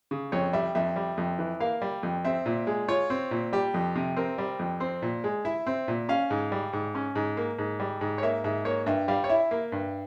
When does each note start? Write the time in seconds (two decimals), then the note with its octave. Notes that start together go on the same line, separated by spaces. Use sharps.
0.11 C#3
0.32 F2 C#5
0.53 G3 E5
0.75 F2 E5
0.96 G3
1.17 F2
1.39 E3
1.60 A#3 F5
1.82 G3
2.03 F2
2.25 C4 E5
2.46 A#2
2.67 G#3
2.89 F4 C#5
3.10 C4
3.31 A#2
3.53 G3 G4
3.74 F2
3.96 C3
4.17 C4 A#4
4.38 G3
4.59 F2
4.80 C4 C5
5.02 A#2
5.24 G#3
5.45 E4 E5
5.67 C4
5.88 A#2
6.09 C#4 F5
6.30 G#2
6.52 G3
6.73 G#2
6.95 C#4
7.15 G#2
7.37 A#3
7.59 G#2
7.80 G3
8.01 G#2
8.18 C#5
8.23 A#3 E5
8.44 G#2 E5
8.65 A#3 C#5
8.86 G2 E5
9.08 G3 F5
9.24 C#5
9.29 E4 E5
9.51 A#3
9.72 G2